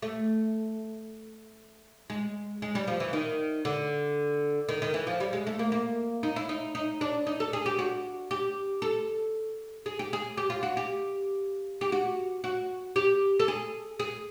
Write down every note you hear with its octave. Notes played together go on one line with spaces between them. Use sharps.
A3
G#3
G#3
G3
F3
E3
D#3
D3
D#3
D#3
E3
F3
G3
G#3
A3
A#3
A#3
D#4
E4
D#4
D#4
D4
D#4
A4
G#4
G4
F#4
G4
A4
G#4
G4
G#4
G4
F4
F#4
G4
G4
F#4
F#4
G4
A4
G#4
G#4